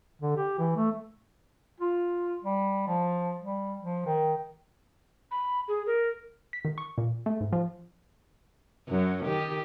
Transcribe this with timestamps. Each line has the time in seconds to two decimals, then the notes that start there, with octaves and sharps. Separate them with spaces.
0.22 D3
0.37 G4
0.59 E3
0.76 A3
1.80 F4
2.44 G3
2.88 F3
3.40 G3
3.80 F3
4.06 D#3
5.31 B5
5.68 G#4
5.87 A#4
6.53 B6
6.65 D#3
6.78 C#6
6.98 A#2
7.26 A3
7.41 G#2
7.53 F3
8.88 F#2 F#3
9.25 D#3 G4